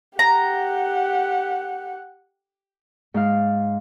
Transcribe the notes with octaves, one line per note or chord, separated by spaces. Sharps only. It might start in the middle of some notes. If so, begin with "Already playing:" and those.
G4 F#5 A#5
G#2 F5